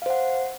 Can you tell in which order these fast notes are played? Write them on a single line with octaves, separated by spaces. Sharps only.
F5 C5 F#5